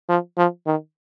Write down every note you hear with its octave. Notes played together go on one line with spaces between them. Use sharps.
F3
F3
D#3